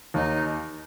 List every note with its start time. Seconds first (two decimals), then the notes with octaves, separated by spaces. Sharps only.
0.14 D#2 D#4